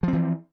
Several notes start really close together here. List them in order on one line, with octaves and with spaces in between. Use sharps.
F3 C4 E3